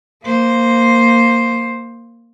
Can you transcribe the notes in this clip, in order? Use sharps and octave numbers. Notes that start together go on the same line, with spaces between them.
A#3 C5